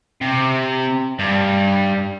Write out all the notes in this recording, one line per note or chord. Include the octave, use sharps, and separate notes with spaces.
C3
G2